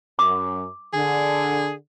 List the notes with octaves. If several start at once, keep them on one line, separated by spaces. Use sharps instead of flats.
F#2 D6
D3 G#4